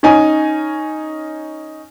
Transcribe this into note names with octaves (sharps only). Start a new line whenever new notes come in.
C#4 D#4 G#5